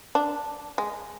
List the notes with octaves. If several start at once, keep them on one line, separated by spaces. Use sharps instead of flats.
D4
G#3